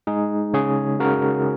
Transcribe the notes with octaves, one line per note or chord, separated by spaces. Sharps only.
G#3 D#4 G#4
C#3 G#4 C#5
C#3 F#4 A#4